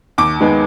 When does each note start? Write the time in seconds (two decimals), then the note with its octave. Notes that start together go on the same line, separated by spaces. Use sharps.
0.18 D#2 D6
0.40 D#3 G#3 B3